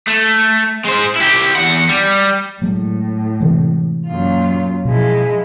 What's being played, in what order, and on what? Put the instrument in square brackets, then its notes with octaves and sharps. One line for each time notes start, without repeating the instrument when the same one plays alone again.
[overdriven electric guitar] A3
G#3 C5
E4 G4
E2 F#5
G3
[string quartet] A2 [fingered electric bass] F#3 G#3 A3
[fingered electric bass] C3 E3 G#3
[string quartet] F#2 A#2 F4
[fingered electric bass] B2 [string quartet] F3 G#3 E4